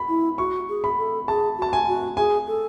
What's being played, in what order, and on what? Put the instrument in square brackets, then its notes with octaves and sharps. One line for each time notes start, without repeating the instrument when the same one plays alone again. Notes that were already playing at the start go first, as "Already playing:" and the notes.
Already playing: [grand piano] B5
[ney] E4
[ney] F#4 [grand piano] C#6
[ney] G#4
[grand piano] B5
[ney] A4
[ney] G#4 [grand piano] A5
[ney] F#4 [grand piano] A5
[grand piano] G#5
[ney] F#4
[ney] G#4 [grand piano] G#5
[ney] A4